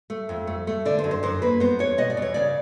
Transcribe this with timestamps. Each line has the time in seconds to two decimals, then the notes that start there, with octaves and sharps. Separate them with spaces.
0.10 A3
0.29 F2
0.47 A3
0.67 A3
0.85 D3 D5
0.99 C5
1.04 F#2
1.11 C5
1.23 F#2 C5
1.42 A#3 B4
1.60 B3 C5
1.79 E2 C#5
1.98 B2 D#5
2.10 D5
2.17 E2 C#5
2.34 C#3 D5